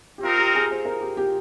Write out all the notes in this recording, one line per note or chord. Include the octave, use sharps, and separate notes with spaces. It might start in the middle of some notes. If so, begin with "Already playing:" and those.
G4
C4 D#4 F4 A#4
G4
G#4
C5
A#4
G4
G4